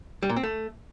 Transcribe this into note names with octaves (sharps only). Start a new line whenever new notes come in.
G3
A#2
C4
A3